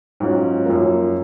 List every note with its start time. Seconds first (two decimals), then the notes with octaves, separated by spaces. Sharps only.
0.20 G#2 F#3 C#4 F4
0.65 F#2 F3 A#3